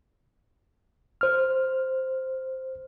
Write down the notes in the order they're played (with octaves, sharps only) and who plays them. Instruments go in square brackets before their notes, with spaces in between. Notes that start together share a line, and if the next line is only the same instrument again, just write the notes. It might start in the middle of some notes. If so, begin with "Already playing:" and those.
[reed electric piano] C5 F6